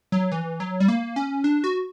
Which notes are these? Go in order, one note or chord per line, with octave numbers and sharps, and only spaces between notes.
F#3
E3
F#3
G3
A#3
C#4
D4
F#4